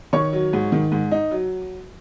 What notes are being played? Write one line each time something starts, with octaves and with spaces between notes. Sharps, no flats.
D#3 C#5 C#6
F#3
G#2
D#3
G#2
D#4
F#3